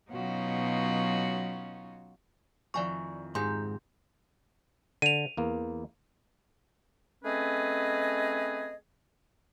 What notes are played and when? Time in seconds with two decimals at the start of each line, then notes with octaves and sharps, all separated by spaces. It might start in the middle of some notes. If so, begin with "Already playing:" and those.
0.10 B2 F#3 C#4 D#4 F4 F#4
2.74 F2 D#3 E4 D5 G#5 C#6
3.35 G#2 D#4 G4 C6 G6
5.02 D3 D#7 F7
5.37 E2 A#3
7.24 A3 C4 C#4 G#4 B4 D#5